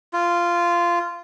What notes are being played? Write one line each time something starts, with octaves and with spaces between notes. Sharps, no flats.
F4